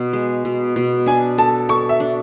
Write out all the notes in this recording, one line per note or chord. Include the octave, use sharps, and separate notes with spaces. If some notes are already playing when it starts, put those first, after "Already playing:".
Already playing: B2
G#3
B2
B2
D4 G#5
A4 A5
A4 C#6
E5
D4